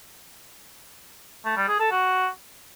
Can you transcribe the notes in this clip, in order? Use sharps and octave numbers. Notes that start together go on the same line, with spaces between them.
A3
G3
G#4
A4
F#4